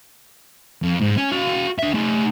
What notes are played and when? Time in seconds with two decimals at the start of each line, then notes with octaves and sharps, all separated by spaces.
0.83 F2
1.01 G#2
1.18 C#4
1.32 F#4 F5
1.79 D3 E5
1.94 A3 D#4